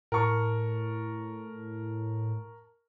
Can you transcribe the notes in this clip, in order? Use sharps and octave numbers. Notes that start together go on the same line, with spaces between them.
A2 A#4 A5 C#6